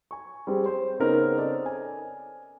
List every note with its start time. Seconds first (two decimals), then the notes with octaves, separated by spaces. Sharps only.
0.11 G#5 C#6
0.47 G3 C4 G#4
0.66 C5
0.99 C#3 B3 C4 D#4 A#4 C#5
1.38 A4 C5 D5 D#5
1.66 G#5